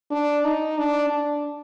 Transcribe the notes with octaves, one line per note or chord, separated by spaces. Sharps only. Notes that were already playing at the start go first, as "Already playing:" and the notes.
D4
D#4
D4
D4